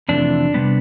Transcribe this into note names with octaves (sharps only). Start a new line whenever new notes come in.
F2 C3 E3 A3 D4
C3 G3 B3